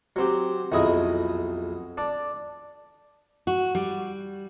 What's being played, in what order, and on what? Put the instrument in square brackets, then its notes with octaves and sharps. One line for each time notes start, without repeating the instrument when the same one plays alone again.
[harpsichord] F#3 C4 G4
B1 F2 E4 G#4 D#5
D4 D5
[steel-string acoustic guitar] F#4
G3